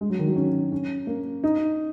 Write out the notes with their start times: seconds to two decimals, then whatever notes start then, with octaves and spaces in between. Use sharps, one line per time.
0.01 G#3
0.10 F#3
0.19 D#3
0.27 F#3
0.36 C#4
0.72 C#4
1.07 A#3
1.44 D#4